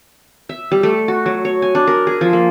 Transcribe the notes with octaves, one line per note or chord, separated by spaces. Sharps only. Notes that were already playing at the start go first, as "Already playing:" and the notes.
E5
G3
A3
F#4
F#3
C#5
G#5
D4
A#4
G#4
F3
A#3